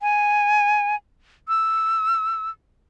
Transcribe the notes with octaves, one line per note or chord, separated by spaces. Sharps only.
G#5
E6